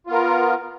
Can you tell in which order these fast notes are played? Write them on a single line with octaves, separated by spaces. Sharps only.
F4 B3 A#4